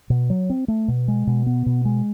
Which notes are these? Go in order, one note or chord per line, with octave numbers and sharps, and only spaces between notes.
B2
F#3
C4
A3
B2
G#3
B2
B3
B2
G#3